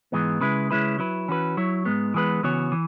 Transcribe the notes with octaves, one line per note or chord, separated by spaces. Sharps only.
G#2 E3 G#3 B3
C#3 G#3 E4 B4
C#3 G#3 C#4 E4 B4
F#3 E4 B4
E3 C#4 F#4 B4
F#3 E4 C#5
G#2 G#3 B3
E3 G#3 B3 G#4 B4
C#3 E3 B3 F#4 C#5
E3